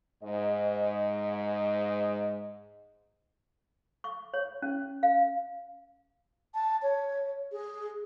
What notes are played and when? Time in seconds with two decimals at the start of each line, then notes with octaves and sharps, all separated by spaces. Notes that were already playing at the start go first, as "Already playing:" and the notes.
0.23 G#2 D#5
4.04 C#6
4.34 C#5
4.62 C#4
5.03 F5
6.54 A5
6.82 C#5
7.52 G#4